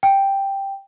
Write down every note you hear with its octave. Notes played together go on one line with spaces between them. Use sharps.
G5